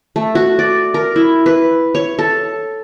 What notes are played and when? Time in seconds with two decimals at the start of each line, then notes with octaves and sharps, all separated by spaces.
0.16 A3
0.35 F#4
0.59 D5
0.94 A#4
1.16 E4
1.46 B4
1.95 C#5
2.19 A4